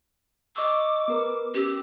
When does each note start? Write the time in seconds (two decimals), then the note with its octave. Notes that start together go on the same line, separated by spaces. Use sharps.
0.56 D#5 C#6 D6 E6
1.08 B3 A#4 B4
1.55 C#4 G4 E6